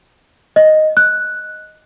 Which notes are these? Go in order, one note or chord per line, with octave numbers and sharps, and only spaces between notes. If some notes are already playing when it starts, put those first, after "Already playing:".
D#5
F#6